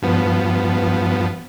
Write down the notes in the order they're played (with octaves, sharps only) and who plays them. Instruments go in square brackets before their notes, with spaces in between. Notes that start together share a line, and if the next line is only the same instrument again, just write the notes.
[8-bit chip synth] G2 F3 B3